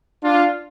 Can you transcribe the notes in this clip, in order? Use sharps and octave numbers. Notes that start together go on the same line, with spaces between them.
D4 F4